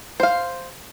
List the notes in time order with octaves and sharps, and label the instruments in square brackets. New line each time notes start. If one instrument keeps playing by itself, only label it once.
[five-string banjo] C5 F5